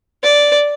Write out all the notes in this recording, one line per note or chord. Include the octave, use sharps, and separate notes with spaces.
D5